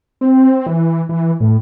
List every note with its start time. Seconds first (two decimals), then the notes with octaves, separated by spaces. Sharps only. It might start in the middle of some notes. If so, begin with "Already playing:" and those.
0.21 C4
0.66 E3
1.09 E3
1.40 A2